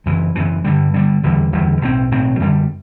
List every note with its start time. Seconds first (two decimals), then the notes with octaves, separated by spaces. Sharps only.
0.06 F#1 F#2 E3
0.35 F#1 F#2 E3
0.64 G2 D3 G3
0.94 G2 D3 G3
1.23 F#1 E2 D3 G3
1.53 F#1 E2 D3 G3
1.81 B1 A2 F#3 C4
2.11 B1 A2 F#3 C4
2.40 F#2 D3 G3